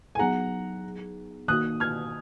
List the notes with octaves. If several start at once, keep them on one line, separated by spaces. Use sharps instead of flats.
G#5
F#3 B3 D#4 G#4 F#5 A#5
D#3 A#3 D#4 F#4 D#6 F#6
F6 G#6